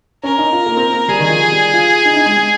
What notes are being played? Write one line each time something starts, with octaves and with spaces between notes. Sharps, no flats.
C#4 A#4
D#4
F4
A#3
C4
A#3
G3 G#4
D#3
F3
G3
F4
D#4
D#4
G#3
G#3